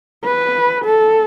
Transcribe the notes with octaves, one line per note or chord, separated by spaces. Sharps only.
B4
A4